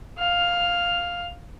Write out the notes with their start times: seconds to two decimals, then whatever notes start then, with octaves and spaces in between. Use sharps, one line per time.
0.19 F5 F6